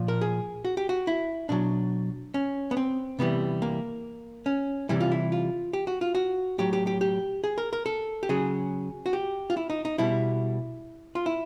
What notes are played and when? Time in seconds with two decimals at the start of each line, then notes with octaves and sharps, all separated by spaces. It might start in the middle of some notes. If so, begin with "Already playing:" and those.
Already playing: A#2 F3
0.08 A#4
0.21 G#4
0.65 F#4
0.77 G4
0.89 F#4
1.07 E4
1.49 B2 F#3 D4
2.34 C#4
2.71 B3
2.77 C4
3.19 C3 E3 G3 B3
3.62 A#3
4.46 C#4
4.89 C3 E3 G3 E4
5.00 F4
5.11 E4
5.32 F4
5.73 G4
5.87 F#4
6.01 F4
6.15 F#4
6.58 A2 F#3 G4
6.73 G4
6.87 G4
7.01 G4
7.44 G#4
7.58 A#4
7.73 A#4
7.86 A4
8.23 G4
8.29 C#3 F#3 G#4
9.06 F#4
9.13 G4
9.50 F4
9.57 E4
9.70 D#4
9.85 D#4
9.98 B2 G3 E4
11.15 F4
11.26 E4